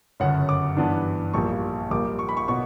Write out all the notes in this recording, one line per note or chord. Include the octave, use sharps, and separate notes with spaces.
G1 F#2 C#3 F#5
D6
G2 E3 B3 D4
A#1 A#2 G3 A#3 C#6
A#1 A#2 G3 A#3 D6
C#6
B5
C#6
B2 F#3 B3 C#6